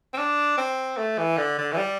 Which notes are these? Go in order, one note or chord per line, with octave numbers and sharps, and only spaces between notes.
C4
D4
C4
A3
E3
D3
D3
E3
G3